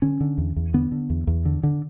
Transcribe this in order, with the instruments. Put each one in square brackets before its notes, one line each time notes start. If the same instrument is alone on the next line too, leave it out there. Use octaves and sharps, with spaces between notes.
[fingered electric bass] D3 C#4
D3
E2
E2
D3 B3
D3
E2
E2
D3
D3